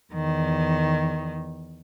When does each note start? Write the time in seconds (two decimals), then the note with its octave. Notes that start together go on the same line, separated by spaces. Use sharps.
0.13 E2 D#3